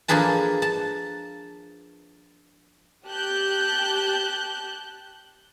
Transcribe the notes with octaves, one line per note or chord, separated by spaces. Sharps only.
F3 A#3 D4 G#4 B4 A5
A5
G4 A5 F#6 G6